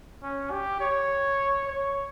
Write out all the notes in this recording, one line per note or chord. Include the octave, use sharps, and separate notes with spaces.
C#4
G4
C#5
C#5